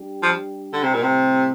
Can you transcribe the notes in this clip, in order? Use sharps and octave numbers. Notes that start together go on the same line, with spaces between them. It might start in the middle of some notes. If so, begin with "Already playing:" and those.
Already playing: G3 D4 G4
F3
D3
C3
A#2
A2 C3 G3 C4